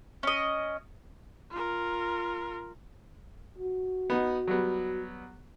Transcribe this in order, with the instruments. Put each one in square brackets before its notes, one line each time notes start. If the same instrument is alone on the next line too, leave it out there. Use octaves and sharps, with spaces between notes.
[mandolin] C#4 D#5
[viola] F4 A#4
[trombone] F#4
[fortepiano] B3 D#4
F#3 G3 B3